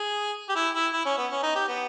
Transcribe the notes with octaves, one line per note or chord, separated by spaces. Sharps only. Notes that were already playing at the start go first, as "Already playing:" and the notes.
Already playing: G#4
G4
E4
E4
E4
C#4
B3
C#4
D#4
G4
B3